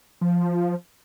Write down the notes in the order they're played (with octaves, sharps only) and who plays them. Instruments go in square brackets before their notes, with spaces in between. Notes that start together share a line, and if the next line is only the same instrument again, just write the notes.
[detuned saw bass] F3